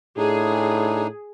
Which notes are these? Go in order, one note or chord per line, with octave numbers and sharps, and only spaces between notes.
A2 D4 D#4 G#4